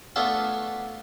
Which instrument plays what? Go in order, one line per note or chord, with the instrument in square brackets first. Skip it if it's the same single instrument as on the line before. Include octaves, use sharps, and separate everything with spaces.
[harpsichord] A3 B3 D4 F4 A4 C#5